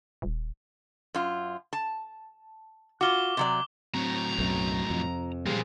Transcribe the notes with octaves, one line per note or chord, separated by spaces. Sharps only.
D#1
F#2 F4
A5
F4 F#4 D6 G7
C3 F#3 D5
A2 F#3 C4 A#5
B1 F#2
F2 C3 F3
A#2 C#3 E3 G3 G#3 A#3 G#4